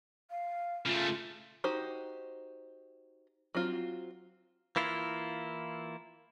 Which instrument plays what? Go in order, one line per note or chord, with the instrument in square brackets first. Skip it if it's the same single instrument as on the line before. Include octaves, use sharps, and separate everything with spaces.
[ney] F5
[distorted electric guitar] C#3 A3 [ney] F4
[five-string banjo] D#4 F#4 G4 C5
F#3 C4 F4
[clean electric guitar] E3 A#3 E4 F4